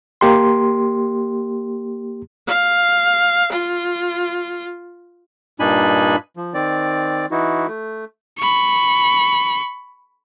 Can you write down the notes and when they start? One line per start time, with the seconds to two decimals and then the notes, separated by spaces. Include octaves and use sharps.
0.21 A#3 G4 C6
2.47 F5
3.52 F4
5.60 G2 A#2 D4 D#4 G#5 B5
6.37 F3
6.54 D#3 C4 D5
7.31 E3 D#4 E4 F#4
7.67 A3
8.38 B5 C#6